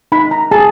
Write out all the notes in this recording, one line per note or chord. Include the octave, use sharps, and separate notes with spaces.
D#4 B5
A#5
G#4 A5